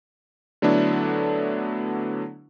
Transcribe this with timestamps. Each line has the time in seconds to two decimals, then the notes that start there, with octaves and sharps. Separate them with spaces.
0.62 D3 F#3 A3 B3 D4 E4